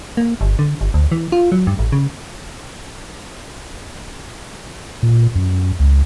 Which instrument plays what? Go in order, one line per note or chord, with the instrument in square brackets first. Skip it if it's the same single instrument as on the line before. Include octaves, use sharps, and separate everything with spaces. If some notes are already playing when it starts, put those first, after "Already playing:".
[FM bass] A#3
G1
D3
G1
D2
E3
F4
F#3
G2
A1
C#3
[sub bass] A#2
F#2
C#2